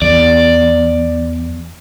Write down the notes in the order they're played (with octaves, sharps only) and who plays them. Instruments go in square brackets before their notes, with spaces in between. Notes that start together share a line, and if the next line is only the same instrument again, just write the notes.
[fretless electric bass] E2 [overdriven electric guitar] D5